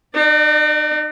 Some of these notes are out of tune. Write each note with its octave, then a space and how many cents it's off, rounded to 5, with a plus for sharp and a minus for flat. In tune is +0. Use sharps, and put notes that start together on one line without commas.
D#4 -40 D5 +20